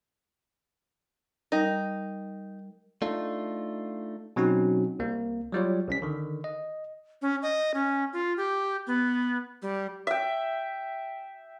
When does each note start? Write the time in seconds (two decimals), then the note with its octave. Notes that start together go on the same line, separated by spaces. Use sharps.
1.52 G3 D#4 A#4
3.02 A3 D4 D#4 F4
4.36 B2 F#3 C4 C#4 D#4 F#4
4.99 C2 A#3
5.53 F#3 G3 F4 C#5
5.88 C2 C#4 B6
6.02 D3 D#3
6.44 D#5
7.22 C#4
7.43 D#5
7.74 C#4
8.13 F4
8.37 G4
8.87 B3
9.62 G3
10.07 E5 G5